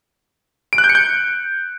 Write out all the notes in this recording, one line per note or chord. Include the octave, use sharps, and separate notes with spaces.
D7
F#6
G6
C#7
G6